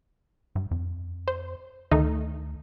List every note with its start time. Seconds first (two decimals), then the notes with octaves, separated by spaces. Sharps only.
0.55 G2
0.71 F2
1.28 C5
1.91 D2 D#3 A3 D#4